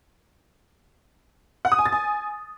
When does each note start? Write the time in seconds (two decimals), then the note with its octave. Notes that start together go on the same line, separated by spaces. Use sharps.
1.65 F#5
1.72 D#6
1.79 G#5
1.86 A6
1.92 G#5